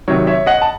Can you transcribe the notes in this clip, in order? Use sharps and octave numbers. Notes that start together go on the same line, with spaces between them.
C3 D#3 F#3 C#5
C#5 E5
D#5 F#5
A5